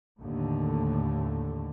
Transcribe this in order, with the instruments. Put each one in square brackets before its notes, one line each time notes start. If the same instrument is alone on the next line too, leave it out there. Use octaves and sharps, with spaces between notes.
[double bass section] D#2 A2 D3 A3